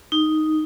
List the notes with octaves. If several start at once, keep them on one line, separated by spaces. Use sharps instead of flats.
D#4